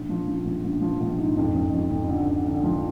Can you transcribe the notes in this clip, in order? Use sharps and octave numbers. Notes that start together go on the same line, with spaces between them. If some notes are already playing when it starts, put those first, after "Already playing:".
Already playing: A#1
F3
F3
A#1
A#1
F3
A#1
G#2
F2
F2
F2
F2
D3
D3
D3
F3